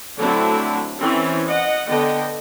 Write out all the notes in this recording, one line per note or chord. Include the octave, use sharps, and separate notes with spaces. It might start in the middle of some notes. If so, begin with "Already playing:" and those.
D3 F#3 A3 C4 D4 E4
E3 C4 C#4 E4
D#5 F#5
D3 B3 D#5 G5